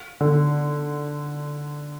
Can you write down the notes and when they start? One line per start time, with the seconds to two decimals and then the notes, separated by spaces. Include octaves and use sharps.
0.21 D3